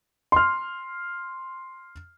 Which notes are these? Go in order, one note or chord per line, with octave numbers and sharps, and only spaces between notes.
C6 F6